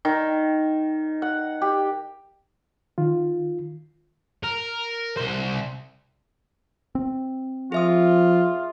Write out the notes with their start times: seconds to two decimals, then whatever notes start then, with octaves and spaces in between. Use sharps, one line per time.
0.05 D#3
1.22 F#5
1.62 G4
2.98 D#3 F4
4.43 A#4
5.17 C2 C5
6.95 C4
7.72 F3 F4 G#4 E5 D#6